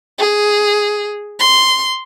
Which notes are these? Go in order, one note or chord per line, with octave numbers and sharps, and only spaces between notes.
G#4
C6